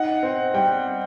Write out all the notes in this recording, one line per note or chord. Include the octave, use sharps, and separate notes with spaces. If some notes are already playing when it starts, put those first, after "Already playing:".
Already playing: D#4 F#5
C4
G3 G5